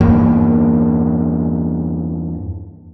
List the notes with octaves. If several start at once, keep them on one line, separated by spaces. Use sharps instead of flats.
E2 G2 A#3